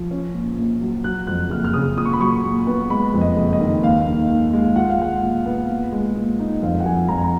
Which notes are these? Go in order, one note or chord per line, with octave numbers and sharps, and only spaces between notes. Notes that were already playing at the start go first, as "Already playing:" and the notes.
Already playing: F3
C#4
A#2
A#1
F#3
F#3 F#6
F2 F#6
F#1 F6
F6
C#3 D#6
A#2 D#6
C#6
B5
F#3 C#6
A#2
B3
G#3 B5
F2
D#5
F#1
D#5
D#3
D#2 F5
D#3
D#2
G#3
F4 F#5
F5
G#3 F#5
A#2
B3
A#2
G#3
A#2
D#4
F2 F5
F#5
F3 G#5
F2 A#5
A#5